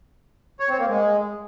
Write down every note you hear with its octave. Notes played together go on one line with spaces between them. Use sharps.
C#5
C4
A#3
G#3